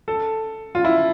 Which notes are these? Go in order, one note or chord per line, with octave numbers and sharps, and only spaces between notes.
A4
F4
E4